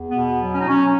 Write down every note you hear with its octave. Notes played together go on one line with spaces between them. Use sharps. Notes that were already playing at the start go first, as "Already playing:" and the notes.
Already playing: E2
B2 B3
F#3
C#4
D#4
F#3 C#4